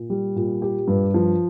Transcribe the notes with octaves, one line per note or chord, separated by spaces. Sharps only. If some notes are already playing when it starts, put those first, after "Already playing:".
Already playing: A#2
G3
A#2
G4
G2
F3